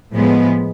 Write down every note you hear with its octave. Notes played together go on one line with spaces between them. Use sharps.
A2 F3 G#3 B3